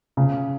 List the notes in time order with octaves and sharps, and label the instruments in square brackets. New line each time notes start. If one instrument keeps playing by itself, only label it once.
[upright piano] C#3